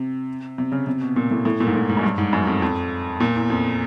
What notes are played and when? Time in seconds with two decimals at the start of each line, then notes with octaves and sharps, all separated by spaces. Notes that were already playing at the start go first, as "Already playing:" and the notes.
Already playing: C3
0.58 C3
0.72 C#3
0.87 C3
1.01 B2
1.16 A#2
1.31 A2
1.45 A2
1.60 A#2
1.67 G#2
1.75 A2
1.89 G#2
1.97 F#2
2.03 G2
2.18 G#2
2.33 F#2
2.47 F2
2.62 F2
3.20 A#2
3.36 E2
3.50 F2